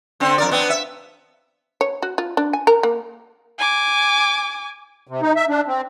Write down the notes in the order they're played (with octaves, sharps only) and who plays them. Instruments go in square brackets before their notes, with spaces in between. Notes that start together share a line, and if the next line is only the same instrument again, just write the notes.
[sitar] D3 C4
F2 A#4 D5
B3 C4 D4
E5
[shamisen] C#5
F#4
F4
D4
G#5
A#4
A#3
[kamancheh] G#5 D6
[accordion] C3
D#4
E5
D4
C4